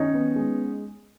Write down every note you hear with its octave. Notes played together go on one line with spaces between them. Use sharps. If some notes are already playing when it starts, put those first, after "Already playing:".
Already playing: D#3 C#4 D#4
B3
G#3